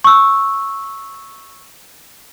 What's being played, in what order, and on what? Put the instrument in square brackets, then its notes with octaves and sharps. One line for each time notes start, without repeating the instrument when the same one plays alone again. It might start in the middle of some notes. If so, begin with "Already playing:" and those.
[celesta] C#6 E6